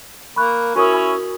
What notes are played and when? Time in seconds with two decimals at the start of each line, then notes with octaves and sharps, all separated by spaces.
0.36 A#3 B5 C#6 F#6
0.75 C#4 E4 F#4 A#4 C#5 D#6